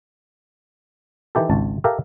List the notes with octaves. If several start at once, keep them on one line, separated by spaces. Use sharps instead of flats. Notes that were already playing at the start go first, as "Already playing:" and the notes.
D#3 E3 E4 G4 A4
G#1 C#2 A5
G4 A4 A#4 E5 F5